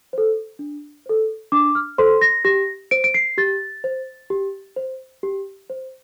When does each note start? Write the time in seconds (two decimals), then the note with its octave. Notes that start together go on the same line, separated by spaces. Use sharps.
0.13 A4 C5
0.59 D4
1.06 A4 C5
1.52 D4 D6
1.75 F6
1.98 A4 C5 C6
2.21 A#6
2.45 G4 A#6
2.91 C5 D7
3.04 D7
3.14 C7
3.38 G4 A6
3.84 C5
4.30 G4
4.76 C5
5.23 G4
5.70 C5